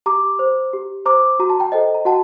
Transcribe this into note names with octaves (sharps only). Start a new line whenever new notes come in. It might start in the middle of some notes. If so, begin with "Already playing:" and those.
G4 A#5 D6
C5
G4
C5 A#5 D6
F#4 A#5
A5
G5 A#5
A4 C5 D#5 G5
A#5
F#4 F#5 A5